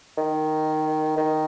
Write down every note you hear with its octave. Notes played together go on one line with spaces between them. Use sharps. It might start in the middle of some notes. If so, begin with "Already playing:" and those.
D#3
D#3